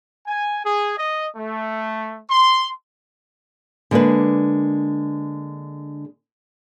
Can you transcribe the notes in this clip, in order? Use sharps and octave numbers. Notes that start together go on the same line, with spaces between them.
G#5
G#4
D#5
A3
C6
D3 G#3 A#3 D4 B4